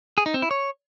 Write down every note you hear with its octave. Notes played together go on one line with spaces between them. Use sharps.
G#4
D#4
C4
E4
C#5